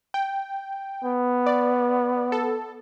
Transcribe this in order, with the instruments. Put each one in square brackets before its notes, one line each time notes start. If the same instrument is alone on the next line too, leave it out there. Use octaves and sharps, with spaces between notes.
[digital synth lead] G5
[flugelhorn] B3
[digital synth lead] D5
A4